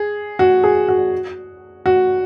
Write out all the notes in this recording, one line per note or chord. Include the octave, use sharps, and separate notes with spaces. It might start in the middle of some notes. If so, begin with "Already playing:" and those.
Already playing: G#4
F#4
G#4
F#4
F#4